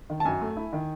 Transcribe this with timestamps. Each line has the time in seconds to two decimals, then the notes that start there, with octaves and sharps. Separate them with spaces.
0.10 D#3
0.20 A5
0.25 F#2 G#5
0.41 A3
0.57 E4
0.73 D#3